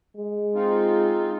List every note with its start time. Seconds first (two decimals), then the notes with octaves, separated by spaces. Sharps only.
0.17 G#3
0.55 C4 D#4 F4